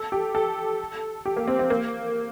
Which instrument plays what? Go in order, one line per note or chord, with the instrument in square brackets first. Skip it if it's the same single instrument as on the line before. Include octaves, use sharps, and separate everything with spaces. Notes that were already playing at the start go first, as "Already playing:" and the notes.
Already playing: [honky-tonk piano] A4
G4
A4
G4
A#3
C4
C4
A#3